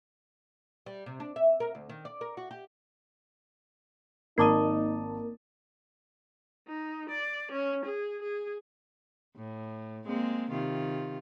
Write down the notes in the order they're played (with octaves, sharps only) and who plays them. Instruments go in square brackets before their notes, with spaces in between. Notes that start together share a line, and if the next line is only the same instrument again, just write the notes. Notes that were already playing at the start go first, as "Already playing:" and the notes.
[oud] G3
C3
D4
E5
A#4
D2
D#3
D5
A#4
F#4
G4
[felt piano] G#1 A5 D#7 [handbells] A#3 D6 D#6 [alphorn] D#4 [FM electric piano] A#4
[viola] D#4
D5
C#4
G#4
G#4
[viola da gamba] A2
G#3 A#3 C4
C3 D#3 F4